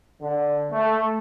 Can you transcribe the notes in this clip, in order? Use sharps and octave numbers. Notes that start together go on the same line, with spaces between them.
D3
A3